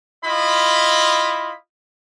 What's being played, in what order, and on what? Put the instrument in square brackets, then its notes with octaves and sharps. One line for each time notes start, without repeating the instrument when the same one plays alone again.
[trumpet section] E4 F4 D#5 B5